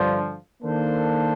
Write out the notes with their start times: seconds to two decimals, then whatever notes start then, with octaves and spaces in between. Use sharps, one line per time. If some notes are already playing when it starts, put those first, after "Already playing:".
Already playing: G2 D3 F3
0.63 D#3 A#3 D4 A4 C5